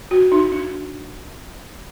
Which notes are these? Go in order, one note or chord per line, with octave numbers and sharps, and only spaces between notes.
F#4
D#4
D4